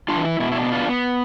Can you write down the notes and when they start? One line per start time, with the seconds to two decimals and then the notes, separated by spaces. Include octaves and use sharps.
0.08 D4 F4
0.16 E3
0.25 E4
0.40 B2 E4
0.52 E4
0.56 D4
0.64 B3
0.72 D4 F4
0.89 B3